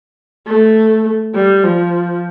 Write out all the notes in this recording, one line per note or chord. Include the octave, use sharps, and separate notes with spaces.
A3
G3
F3